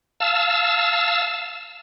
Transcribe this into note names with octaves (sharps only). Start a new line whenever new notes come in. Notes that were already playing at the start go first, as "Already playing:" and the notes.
F5 A5 E6